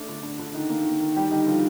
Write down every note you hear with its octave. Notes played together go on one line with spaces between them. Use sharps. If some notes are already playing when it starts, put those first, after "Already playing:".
Already playing: A3 D4
D3
D3
D3
D#3 D#4
A#3
D#3
D#3
G3 G4
D3 D#4
D3 F3 F4